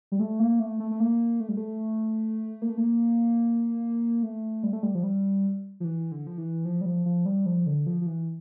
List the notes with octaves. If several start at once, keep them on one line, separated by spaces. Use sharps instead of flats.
G3
A3
A#3
A3
A3
A3
A#3
A3
G3
A3
A#3
A3
A#3
A3
G3
A3
G3
F3
G3
F3
E3
D3
F3
E3
F3
G3
F3
F3
G3
F3
D3
F3
F3
E3